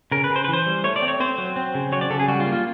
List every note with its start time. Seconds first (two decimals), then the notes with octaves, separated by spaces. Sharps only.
0.11 C#3 A#4
0.24 B4
0.30 C#3
0.36 C5
0.44 B4
0.48 E3
0.53 C5
0.66 G3
0.84 A3 C#5
0.96 D5
1.02 C4
1.08 C#5
1.20 C4 C5
1.38 F#3
1.56 C4
1.75 C#3
1.92 F#3 C#5
2.01 D5
2.10 C#3 A4
2.19 G#4
2.28 G3 F#4
2.40 F4
2.46 A#3
2.53 F4